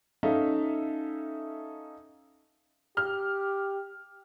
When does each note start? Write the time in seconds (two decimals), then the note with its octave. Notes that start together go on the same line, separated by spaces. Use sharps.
0.23 C#4 D#4 A4 E5 F5
2.97 G4 F6